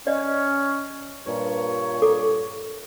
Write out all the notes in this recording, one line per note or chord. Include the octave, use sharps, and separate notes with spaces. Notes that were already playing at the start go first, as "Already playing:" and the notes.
C#4 D5 D#5
G2 A#2 C#5
A4 D6